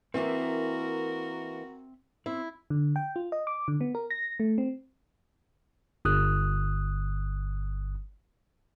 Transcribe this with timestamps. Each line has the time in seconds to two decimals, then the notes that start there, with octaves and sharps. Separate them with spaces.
0.14 E3 A#3 C4 F#4 A#4 E5
2.26 C4 E4
2.70 D3
2.96 G5
3.16 F4
3.32 D#5
3.47 D6
3.68 D3
3.81 B3
3.95 A#4
4.10 A#6
4.40 A3
4.58 C4
6.05 G1 D#6 F#6